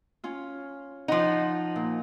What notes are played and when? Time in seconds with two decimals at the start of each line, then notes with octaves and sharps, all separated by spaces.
0.24 C#4 F4
1.08 F3 D#4 F#5 C6
1.76 A#2